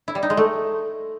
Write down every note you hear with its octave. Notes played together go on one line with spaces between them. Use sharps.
E4
G3
D#4
G#3
A3